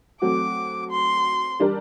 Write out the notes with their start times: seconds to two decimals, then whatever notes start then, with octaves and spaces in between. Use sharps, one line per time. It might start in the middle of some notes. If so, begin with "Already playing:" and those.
0.22 F#3 A3 C4 F#4 D6
0.91 C6
1.60 G3 D4 G4 A#4